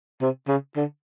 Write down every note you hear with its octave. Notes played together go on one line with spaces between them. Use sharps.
C3
C#3
D3